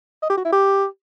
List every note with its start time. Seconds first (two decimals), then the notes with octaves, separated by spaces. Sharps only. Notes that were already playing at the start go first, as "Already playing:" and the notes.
0.22 D#5
0.30 G4
0.37 F#4
0.45 E4
0.52 G4